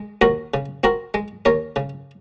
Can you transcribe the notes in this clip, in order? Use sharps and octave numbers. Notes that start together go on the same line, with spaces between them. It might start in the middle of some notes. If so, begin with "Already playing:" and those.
Already playing: G#3
D#2 F#4 A#4
C#3
C4 F#4 A#4
G#3
D#2 A#4 C#5
C#3